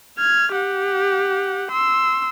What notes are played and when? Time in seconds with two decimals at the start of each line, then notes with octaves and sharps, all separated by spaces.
0.18 F6 G#6
0.52 G4 F#5
1.71 C6 E6